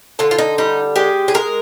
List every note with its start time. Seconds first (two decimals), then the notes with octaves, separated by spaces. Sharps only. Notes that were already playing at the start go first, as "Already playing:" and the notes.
0.19 D3 F4
0.31 F4
0.38 D#4
0.58 G3 D#4
0.96 G#3 G4
1.28 G#4
1.34 G#3 A#4